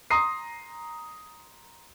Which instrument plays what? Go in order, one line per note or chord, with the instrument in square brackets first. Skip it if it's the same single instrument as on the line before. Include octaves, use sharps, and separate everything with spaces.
[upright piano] A#5 C6 D#6 C7